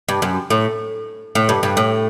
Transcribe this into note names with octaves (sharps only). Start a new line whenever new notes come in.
G2
F#2
A2
A2
G2
G2
A2